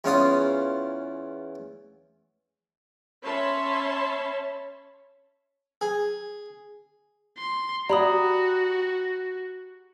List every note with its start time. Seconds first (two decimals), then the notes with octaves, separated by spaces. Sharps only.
0.04 E2 C#4 F4 D#6
3.22 C#4 C#5 E5 A5 B5 C6
5.81 G#4
7.38 C6
7.89 F#4 G4 D5 F5 F#5 A#5 B5 D#6